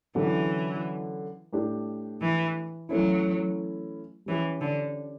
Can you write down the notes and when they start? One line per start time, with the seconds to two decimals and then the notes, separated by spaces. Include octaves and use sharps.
0.15 D3 E3 F#3 C#4 E4 G4
1.53 A2 G3 D4 G4
2.20 E3
2.89 E3 F#3 A3 C#4 E4
4.26 E3 G3 C#4 G4
4.60 D3